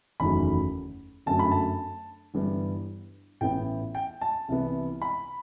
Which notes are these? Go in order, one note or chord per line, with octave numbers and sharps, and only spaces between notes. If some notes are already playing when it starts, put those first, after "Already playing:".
F#1 E2 D#3 F#3 A3 B5
G1 F#2 F#3 A3 A5
B5
A5
G1 G2 E3 G3 B3
A1 A2 E3 B3 G5
G5
A5
C2 C3 E3 B3
B5